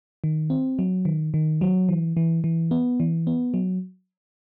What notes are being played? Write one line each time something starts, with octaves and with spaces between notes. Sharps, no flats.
D#3
C4
F#3
D#3
D#3
F#3
E3
E3
E3
B3
E3
B3
F#3